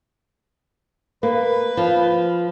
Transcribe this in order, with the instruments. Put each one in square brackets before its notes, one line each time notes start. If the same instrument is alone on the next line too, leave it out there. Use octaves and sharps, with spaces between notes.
[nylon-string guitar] A#3 [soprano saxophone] B4
[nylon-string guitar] F3